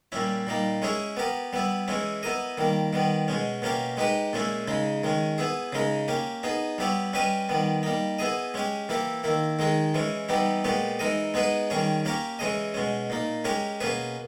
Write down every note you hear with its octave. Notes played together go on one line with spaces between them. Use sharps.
A#2 G3 C#4 E4
A#2 G3 A#3 D#4
G#3 C#4 E4 G#4 C#5
B3 G4 A#4
G3 B3 E4
E3 G#3 C#4 E4
B3 E4 A#4 D#5
D#3 G3 A#3
D#3 G3 B3
B2 G#3 C#4
B2 A#3 C#4 G4 A#4
G#3 D#4 G4 B4
A#2 G#3 C#4 E4
C#3 G#3 D#4
D#3 G#3 C#4
B3 E4 G#4
C#3 G#3 D#4 A#4
A#3 C#4 G4
B3 D#4 G#4
G3 B3 E4 G4 C#5
G3 C#4 G4 B4 D#5
D#3 G3 B3
G3 A#3 D#4
B3 E4 G#4 D#5
G#3 C#4 G4
E3 A#3 E4 G4
D#3 A#3 E4
D#3 G#3 D#4 G#4
E3 G#3 C#4
E3 G3 B3 D#4 G4
A#2 G#3 B3 G4 C#5
E3 G#3 D#4 A#4 D#5
G#3 B3 D#4 G#4 B4
D#3 G3 C#4 G#4 C#5
A#3 C#4 G4 A#4 C#5
E3 G#3 C#4 G#4 D#5
B2 G#3 C#4
A#2 A#3 D#4
G#3 C#4 G4 A#4 C#5
B2 A#3 C#4 G#4 B4